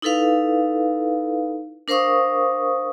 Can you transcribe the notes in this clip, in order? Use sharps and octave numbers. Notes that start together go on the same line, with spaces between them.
D#4 E4 A4 B4 F5
D4 A#4 C5 F5 C#6 D#6